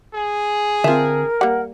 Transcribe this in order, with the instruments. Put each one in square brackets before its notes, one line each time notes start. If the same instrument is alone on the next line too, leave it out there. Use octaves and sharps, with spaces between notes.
[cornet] G#4
[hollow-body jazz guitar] D3 C4 [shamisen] F4 E5 [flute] A#4
[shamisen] G3 A#3 [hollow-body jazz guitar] F#5